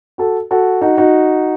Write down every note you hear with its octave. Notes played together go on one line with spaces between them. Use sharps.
F#4 A4
F#4 A4
D#4 F#4
D#4 F#4